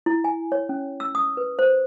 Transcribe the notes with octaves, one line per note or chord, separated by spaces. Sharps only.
E4
G#5
C#5
C#4
E6
D#6
B4
C5